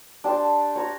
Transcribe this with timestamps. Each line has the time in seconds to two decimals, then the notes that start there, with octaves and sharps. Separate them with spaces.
0.24 D4 G4 A5 C6
0.76 C#5 A#5